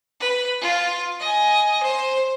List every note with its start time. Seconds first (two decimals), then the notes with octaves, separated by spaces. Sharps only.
0.20 B4
0.61 F4
1.20 D#5 G#5
1.83 C5